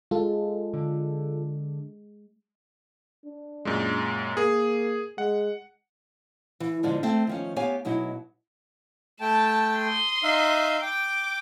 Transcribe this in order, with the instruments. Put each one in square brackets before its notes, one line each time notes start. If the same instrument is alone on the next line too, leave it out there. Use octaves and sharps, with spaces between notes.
[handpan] G#3 [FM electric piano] F4 A4
[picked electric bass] D3
[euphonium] D4
[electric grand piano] F#2 A#2 G#3
[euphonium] A#3 [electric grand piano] G#4
[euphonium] G#3 [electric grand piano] F#5
[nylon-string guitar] E3
E2 G#2 D3 F3 G#3
A3 C4 E5
D#3 F3 C#4
B3 G4 C#5 F5 G#5
B2 F#3 D#4 E4
[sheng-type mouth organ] A3 G5 [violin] A5
[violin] C6 D#6
[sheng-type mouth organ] D#4 E5 F5
[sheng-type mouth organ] G5 [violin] D6